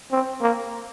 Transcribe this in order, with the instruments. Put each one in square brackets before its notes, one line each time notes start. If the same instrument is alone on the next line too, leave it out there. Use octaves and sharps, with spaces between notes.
[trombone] C4
A#3